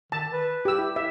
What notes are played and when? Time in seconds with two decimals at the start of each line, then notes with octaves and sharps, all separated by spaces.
0.12 D#3 A5
0.33 B4
0.65 G4 E6
0.78 E4
0.96 E5